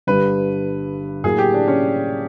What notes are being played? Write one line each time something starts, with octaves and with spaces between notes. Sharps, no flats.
G1 G2 D3 G3 B4
A2 F#3 A#3 G#4
G4
D4
C#4